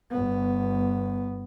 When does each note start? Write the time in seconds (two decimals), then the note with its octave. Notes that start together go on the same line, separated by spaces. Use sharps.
0.11 G1 B3